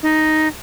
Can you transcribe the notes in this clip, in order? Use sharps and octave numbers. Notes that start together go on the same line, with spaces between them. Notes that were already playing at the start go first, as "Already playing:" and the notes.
D#4